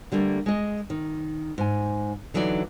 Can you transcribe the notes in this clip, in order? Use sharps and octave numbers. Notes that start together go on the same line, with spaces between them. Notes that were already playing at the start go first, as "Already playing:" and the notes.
D3 G3 A3 A#3
G#3 D#5
D#3
G#2 G#5
D3 E3 F#3 D#4 D5